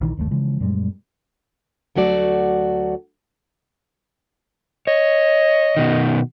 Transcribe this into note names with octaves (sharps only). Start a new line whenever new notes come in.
A#1 D#3 E3
G1 D#2 B2 A3
C#3 E3 F3 G#3
F#2 A#2 G3 G#3
D2 F#3 A3 F#4 D5
C#5 D#5
B2 D#3